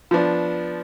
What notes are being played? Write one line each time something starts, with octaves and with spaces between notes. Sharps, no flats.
F3 B3 D4